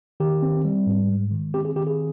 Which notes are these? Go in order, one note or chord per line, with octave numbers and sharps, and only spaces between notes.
D#3 G4
C4
G3
G#2
G#3
D#3
C4 G4
G#4
D#3 G4
G#4